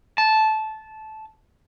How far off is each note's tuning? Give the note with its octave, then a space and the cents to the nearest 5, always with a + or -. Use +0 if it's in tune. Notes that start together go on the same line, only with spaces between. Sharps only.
A5 -15